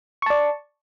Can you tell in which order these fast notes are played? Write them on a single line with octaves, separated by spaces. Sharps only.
C#6 A5 D5